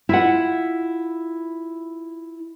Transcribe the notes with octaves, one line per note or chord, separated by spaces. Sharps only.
E4 F4 F#5